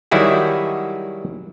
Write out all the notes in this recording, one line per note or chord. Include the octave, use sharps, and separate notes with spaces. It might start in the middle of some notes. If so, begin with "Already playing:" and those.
D#3 F#3 G3 E4 F#4 G#4